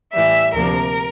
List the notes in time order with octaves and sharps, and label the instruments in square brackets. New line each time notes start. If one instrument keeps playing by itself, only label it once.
[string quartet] A2 E3 G3 E5
D2 C3 F3 A#3 D4 A#4